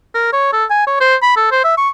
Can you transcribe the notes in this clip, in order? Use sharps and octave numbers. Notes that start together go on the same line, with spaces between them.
A#4
C#5
A4
G#5
C#5
C5
B5
A4
C5
E5
C#6